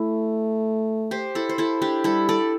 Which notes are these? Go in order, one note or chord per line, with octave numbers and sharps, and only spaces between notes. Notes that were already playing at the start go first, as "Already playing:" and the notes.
Already playing: A3 E4
G4 C5
E4 A4
C5
E4 A4
D4 G4
G3 E4 A4
A4 D5